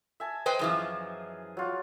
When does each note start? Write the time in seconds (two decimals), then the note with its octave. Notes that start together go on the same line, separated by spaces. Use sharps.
0.20 E5 G#5 A5
0.46 B4 C5 D#5 G5
0.59 F#2 E3 F3 G#4
1.57 F#3 F4